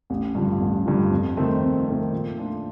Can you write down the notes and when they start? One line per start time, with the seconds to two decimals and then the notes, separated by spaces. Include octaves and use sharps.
0.10 A1
0.35 G2 D3 F3
0.60 A1
0.86 G2 D3 F3
1.11 F2
1.37 D#3 A3 C4
1.62 F2
1.87 D#3 A3 C4
2.12 A#2
2.38 A3 D4 F4